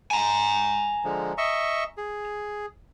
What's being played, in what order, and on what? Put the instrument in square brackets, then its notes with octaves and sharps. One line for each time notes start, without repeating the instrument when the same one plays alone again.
[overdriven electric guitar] G#5 A#5
[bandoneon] D3 F3 G#3
D#5 E5 C#6
G#4